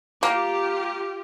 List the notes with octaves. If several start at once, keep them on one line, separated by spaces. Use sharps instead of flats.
A#3 F4 G4